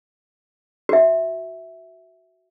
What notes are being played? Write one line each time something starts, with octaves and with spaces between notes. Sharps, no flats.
F#4 E5